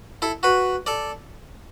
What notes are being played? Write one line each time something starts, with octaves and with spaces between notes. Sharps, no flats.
E4 A4
F#4 B4
A4 D5